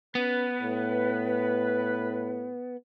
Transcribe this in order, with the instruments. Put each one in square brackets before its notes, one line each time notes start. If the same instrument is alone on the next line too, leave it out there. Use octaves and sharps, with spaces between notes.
[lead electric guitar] B3 [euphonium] C#4 [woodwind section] B4
[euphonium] A2